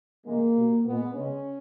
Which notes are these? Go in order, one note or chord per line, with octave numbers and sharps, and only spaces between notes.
C#3 E3 G#3 A#3
B2 G3
A#2 G#3 B3
C#3 G#3 C#4